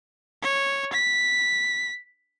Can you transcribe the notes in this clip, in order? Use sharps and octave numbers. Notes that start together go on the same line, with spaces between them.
C#5
B6